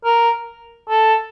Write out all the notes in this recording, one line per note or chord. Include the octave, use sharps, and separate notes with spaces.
A#4
A4